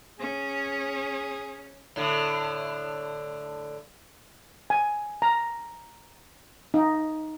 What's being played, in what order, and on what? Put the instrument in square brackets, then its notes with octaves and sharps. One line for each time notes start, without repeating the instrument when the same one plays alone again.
[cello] C#4 [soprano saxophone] G#4
[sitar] A2 D3
[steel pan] G#5
A#5
D#4